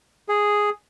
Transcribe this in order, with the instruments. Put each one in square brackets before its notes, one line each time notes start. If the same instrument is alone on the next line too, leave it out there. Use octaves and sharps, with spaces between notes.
[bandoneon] G#4